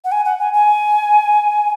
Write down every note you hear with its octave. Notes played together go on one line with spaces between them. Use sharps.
F#5
G#5
F#5
G#5
G#5